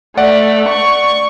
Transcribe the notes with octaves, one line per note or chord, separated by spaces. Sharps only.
A3 D5 F#5
C#6